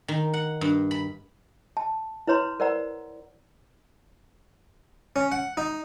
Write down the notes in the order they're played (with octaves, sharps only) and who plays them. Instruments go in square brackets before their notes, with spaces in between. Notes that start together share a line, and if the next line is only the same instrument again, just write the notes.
[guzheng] D#3
F#5
G2
B5
[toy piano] A5
E4 B4 C#5 A#5 C6
A#4 C5 D5 F#5 A#5
[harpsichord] C#4
F#5
D#4